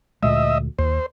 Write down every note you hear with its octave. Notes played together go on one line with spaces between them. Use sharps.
D2 A#2 G#3 D#5 E5
D#2 C5